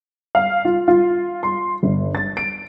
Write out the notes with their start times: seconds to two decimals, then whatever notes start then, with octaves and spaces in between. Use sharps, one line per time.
0.35 F5
0.65 F4
0.88 F4
1.43 C6
1.83 G1
2.15 A6
2.37 D7